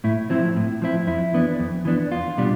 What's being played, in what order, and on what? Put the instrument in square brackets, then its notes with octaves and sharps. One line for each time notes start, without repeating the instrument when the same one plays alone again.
[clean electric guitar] A2 E4
F3 C4 E4
A2
F3 C4 E4
F2 E4
E3 B3 D4
F2
E3 B3 D4
E2 F4
B2 G3 D4